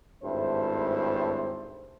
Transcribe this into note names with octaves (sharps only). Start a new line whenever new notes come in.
G#1 G2 A3 E4 C5